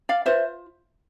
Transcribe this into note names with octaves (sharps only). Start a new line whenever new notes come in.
D5 F5
F4 B4 C5 E5